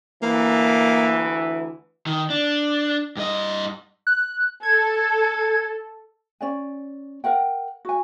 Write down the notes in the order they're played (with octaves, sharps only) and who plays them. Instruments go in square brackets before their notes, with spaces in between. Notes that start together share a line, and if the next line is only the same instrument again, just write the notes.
[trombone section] D2 E3 [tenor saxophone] A#3
[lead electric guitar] D#3
D4
G2 D#5
[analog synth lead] F#6
[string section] A4 [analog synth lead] G#6
[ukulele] C#4 D5 G#5
A#4 F#5 G5
F#4 G#5